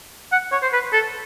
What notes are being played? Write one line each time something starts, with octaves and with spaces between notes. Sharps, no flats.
F#5
C#5
C5
B4
A4